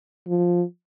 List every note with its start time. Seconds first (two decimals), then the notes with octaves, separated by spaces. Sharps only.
0.28 F3